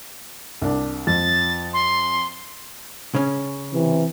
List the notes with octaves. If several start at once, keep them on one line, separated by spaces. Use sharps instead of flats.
C2 D4
F2 A6
C6
C#3 C#4
C3 E3